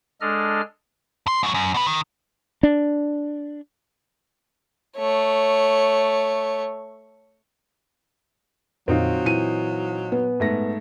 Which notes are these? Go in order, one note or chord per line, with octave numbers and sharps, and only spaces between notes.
G#3 D4 A4 D#5 F6
D2 C6
G#2 F#3
F#2
B2 B4
D#3
D4
A3 C#5
F2 A#2 D3 F#3 C4 D#4 F4
A#2 E3 G#5 D#7
B3
G#2 A3 A#6